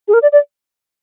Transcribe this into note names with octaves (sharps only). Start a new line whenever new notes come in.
G#4
A#4
D5
D5